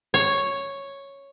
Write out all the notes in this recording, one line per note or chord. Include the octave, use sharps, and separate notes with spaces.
C#5